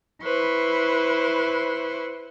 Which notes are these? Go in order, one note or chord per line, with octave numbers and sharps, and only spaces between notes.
E4 B4 C5 C#6